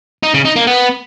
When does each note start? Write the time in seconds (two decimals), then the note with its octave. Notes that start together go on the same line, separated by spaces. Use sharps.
0.23 D#4
0.34 C#3
0.45 D#4
0.56 A#3
0.67 B3